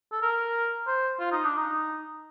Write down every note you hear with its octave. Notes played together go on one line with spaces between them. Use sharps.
A4
A#4
C5
F4
D#4
D4
D#4